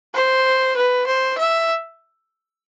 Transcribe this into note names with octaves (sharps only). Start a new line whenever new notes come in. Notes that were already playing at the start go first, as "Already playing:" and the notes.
C5
B4
C5
E5